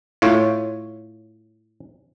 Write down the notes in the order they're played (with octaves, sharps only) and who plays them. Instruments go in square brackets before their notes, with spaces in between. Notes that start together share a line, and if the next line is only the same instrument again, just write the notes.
[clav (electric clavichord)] A2 F4 C#5